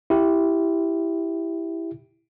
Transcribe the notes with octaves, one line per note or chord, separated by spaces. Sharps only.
E4 G4